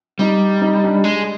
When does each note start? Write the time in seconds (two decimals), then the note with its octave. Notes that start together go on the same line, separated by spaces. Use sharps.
0.19 G3 D#4
0.62 D#4
0.84 D4
1.04 G#3